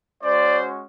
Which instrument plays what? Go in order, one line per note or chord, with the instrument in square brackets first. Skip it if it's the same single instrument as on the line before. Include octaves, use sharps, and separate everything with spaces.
[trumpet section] G#3 C#4 F#4 C5 D5